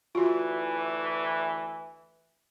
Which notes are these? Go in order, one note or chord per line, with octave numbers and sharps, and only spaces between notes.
D2 E3 F4 F#4